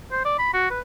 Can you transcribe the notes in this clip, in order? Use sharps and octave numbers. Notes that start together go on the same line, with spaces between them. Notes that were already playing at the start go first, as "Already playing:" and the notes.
C5
D5
B5
F#4
B4